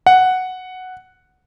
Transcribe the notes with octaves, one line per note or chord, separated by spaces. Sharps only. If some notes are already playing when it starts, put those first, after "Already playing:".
F#5